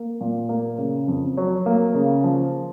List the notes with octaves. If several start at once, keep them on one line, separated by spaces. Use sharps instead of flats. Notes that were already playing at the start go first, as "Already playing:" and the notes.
Already playing: A#3
A#2
A#3
C#3
F2
F#3
A#3
C#3
F3